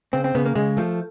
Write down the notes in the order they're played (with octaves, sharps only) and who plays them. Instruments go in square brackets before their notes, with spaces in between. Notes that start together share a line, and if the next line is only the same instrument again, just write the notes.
[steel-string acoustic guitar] C#3 [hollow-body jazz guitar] C4
[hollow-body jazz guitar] C4
[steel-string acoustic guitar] C#3 [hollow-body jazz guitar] B3
[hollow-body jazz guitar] A#3
[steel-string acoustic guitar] C#3 [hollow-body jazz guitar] G#3
[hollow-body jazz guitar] F3 [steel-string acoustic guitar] A3